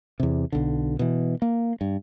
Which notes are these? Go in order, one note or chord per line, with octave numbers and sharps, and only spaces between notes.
E2 C3
B1 D3
B2 E3
A#3
G2